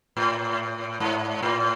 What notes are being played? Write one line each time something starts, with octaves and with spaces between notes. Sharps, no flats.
A2
G#2
A2